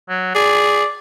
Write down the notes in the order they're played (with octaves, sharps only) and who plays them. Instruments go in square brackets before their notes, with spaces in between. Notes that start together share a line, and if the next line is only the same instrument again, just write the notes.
[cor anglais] F#3
[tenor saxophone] G#4 [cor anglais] D5